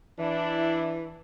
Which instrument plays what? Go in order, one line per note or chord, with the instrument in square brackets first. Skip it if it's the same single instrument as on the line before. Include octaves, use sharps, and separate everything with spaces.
[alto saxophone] E3 [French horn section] D4 E4